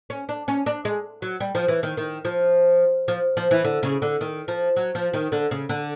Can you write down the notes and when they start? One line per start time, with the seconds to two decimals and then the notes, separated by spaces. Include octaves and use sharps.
0.10 C#4
0.29 D4
0.48 C#4
0.66 D4
0.85 G#3
1.22 F#3
1.40 G3
1.55 F3
1.68 E3
1.83 D#3
1.97 D#3
2.25 F3
3.08 F3
3.37 F3
3.51 E3
3.64 D3
3.83 C#3
4.02 D3
4.21 D#3
4.48 F3
4.76 F#3
4.95 F3
5.14 D#3
5.32 D3
5.51 C#3
5.69 D3